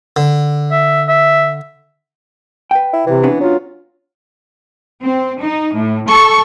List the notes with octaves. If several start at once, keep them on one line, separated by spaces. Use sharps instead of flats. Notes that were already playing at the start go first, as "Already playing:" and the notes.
D3
E5
E5
B4 G5
E4
C3 E3
B3 C#4 D4
F#3 F4
C4
D#4
A2
A4 C#6